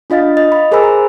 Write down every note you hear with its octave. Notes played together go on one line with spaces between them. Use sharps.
D4 F4 D#5 F5 A6
D#5
B5
G#4 A#4 C5 G#5 B5 E6
A#5